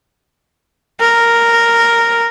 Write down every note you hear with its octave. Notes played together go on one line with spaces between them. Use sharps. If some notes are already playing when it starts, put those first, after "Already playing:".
A#4